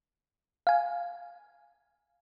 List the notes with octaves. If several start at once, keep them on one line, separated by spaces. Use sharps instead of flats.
F5 G#5